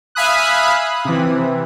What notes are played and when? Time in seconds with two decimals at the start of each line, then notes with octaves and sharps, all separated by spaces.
0.15 E5 F5 G#5 B5 D#6 F#6
1.05 C3 E3